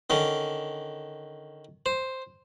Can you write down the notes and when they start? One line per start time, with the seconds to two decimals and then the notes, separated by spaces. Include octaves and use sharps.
0.10 D3 D#3 C#4
1.86 C5